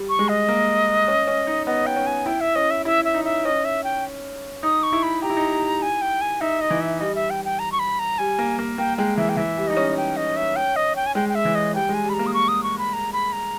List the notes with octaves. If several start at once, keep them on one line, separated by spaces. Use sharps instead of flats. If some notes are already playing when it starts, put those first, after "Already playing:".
Already playing: G3
C#6
G#3
D#5
A#3
C#4
C#4
D#4
B3 D#5
G5
C#4
G#5
E4 G5
E5
C#4 D#5
E5
E4 E5
E5
D#4
E5
C#4 D#5
E5
G5
D#4 D#6
C#6
E4
B5
G4 A#5
E4
D#4
E4
G#5
G5
G#5
D#4 E5
D#5
E3
E5
G3 D#5
E5
G5
G5
A#5
C#6
B5
A#5
G3 G#5
A#3
A#3
A#3 G5
G#3 G5
E3 E5
G5
E3 E5
G3
D#4 D#5
C#4
G5
D#5
E5
G5
D#5
G5
G#5
G#3 G5
G5
E5
E3
D#5
G3 G5
G#3 G#5
G3
B5
A#5
A#3
D#6
C#6
D#6
C#6
B5
A#5
B5
A#5